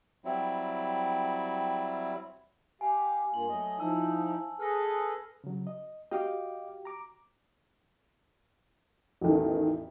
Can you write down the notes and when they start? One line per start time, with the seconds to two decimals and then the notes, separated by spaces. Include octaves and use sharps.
0.25 F#3 G3 C4 E4
2.81 G4 F5 G#5
3.34 G2 A#3 F4 F#7
3.49 F#3 A3 D#5
3.79 F3 D#4 E4 A5 E6
4.60 G#4 A4 B4 F6 A#6
5.44 C#3 F#3
5.67 D#5
6.11 F#4 G4 D#5 F5 G5 D6
6.85 A#5 D6
9.22 A1 E2 D#3 F#4 A4